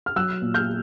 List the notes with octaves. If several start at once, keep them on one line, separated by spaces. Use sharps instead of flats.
F6
F#3 E6 F#6
A#2
F6 G6